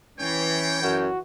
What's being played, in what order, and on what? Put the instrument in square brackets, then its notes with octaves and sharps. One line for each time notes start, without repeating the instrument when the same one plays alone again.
[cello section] E3 [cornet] C#4 [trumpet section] C#5 G5
[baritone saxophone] F#2 [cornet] F#4